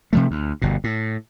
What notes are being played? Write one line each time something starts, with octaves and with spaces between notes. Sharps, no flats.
C3 F3 A3
D2
G1 B2
A2